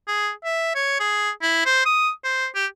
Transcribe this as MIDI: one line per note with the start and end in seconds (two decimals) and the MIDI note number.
0.08 0.30 68
0.44 0.75 76
0.75 0.97 73
1.00 1.30 68
1.42 1.65 64
1.66 1.85 72
1.85 2.10 87
2.24 2.47 72
2.55 2.66 67